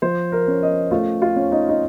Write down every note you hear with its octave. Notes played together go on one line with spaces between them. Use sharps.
F3 C5
A#4
C#4
D#5
A3 F4
F4
C#4
D#4
D#4